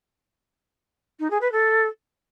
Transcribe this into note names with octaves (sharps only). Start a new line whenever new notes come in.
D#4
G#4
B4
A4